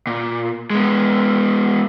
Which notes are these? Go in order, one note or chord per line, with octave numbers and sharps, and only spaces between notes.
A#2
G#3 B3